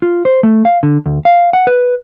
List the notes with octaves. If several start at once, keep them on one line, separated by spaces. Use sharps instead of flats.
F4
C5
A3
F5
D3
D2
F5
F#5
B4